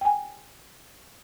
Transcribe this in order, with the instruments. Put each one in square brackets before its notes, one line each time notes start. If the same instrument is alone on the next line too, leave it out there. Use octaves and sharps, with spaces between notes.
[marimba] G5 G#5